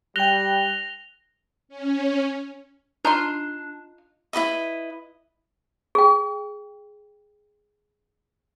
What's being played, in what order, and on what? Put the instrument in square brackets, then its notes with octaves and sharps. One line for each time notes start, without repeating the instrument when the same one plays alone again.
[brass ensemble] G3 [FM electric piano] G5 F#6 [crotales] A#6 F7 G7
[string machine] C#4
[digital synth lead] D4 [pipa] D#4 F4 C6
[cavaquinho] E4 F#4 B4 D#5
[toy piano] G#4 G5